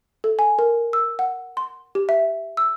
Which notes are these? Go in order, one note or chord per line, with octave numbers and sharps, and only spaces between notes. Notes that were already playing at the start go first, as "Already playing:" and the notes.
A4
G#5
A#4
E6
F#5
C6
G4
E5
E6